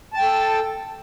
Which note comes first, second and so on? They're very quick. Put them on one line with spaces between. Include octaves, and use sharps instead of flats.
A5 G5 A4